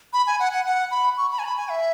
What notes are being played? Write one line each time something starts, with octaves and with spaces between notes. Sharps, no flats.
B5
G#5
F#5
F#5
F#5
B5
C#6
B5
G#5
B5
G#5
E5